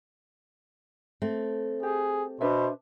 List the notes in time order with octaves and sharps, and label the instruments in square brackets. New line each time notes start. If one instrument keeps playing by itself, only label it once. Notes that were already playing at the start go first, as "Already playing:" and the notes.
[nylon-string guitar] A3 C4
[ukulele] G4 [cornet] G#4
[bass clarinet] B2 [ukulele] D4 B4 E5 [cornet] C5